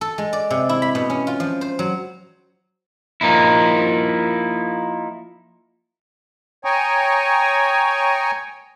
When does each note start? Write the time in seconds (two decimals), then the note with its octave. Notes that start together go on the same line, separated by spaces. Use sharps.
0.01 A4
0.18 G#3
0.33 D5
0.50 C3
0.69 E4
0.82 B5
0.95 B2
1.10 C#4
1.27 F4
1.40 F3
1.61 C5
1.79 F#3
3.21 F3 A#3 D#4 E4
6.65 C#5 G5 G#5 A#5 C#6 D#6